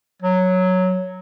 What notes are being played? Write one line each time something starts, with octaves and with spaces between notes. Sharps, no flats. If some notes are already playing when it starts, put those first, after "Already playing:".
F#3